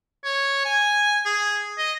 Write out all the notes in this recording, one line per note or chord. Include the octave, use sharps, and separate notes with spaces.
C#5
G#5
G#4
D#5